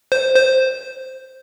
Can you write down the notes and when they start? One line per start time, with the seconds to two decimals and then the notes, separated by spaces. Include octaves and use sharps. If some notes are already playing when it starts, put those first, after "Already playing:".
0.12 C5
0.36 C5